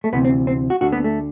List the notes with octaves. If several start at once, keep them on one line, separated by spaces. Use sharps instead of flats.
A3
D2 C3 E3 B3
C4
C4
F#4
D2 D3 F#4
B3
A3